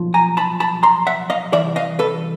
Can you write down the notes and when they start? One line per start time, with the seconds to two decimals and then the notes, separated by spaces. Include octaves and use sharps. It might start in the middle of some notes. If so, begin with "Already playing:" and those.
Already playing: B1 A#2 F3
0.14 G#5 A#5
0.37 A5 B5
0.60 A5 B5
0.83 A#5 C6
1.07 E5 F#5
1.30 D#5 F5
1.53 C3 E3 D5 E5
1.57 C2
1.76 D#5 F5
1.99 A4 B4